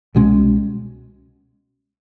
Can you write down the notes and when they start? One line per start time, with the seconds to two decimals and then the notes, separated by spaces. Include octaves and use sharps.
0.15 C2 B2 G#3 C#4